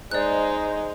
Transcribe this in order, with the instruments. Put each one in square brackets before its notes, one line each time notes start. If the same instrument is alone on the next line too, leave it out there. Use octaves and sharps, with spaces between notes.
[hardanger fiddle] G#3 D#4 [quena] C5 [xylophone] D5 F#6